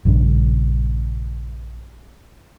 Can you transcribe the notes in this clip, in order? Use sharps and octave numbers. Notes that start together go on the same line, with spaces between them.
A#1 G2 C#3